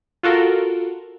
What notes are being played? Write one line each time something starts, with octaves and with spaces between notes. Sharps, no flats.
F4 F#4 A4 A#4